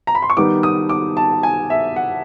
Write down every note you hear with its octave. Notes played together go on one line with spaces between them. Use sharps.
A#5
B5
C6
C#6
D#3 G3 B3 D#4 D6
D#6
D6
A5
G#5
E5
F#5